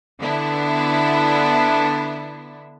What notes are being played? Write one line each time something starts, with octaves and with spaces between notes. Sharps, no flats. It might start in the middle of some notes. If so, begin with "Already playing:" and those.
D3 B3 D4 E4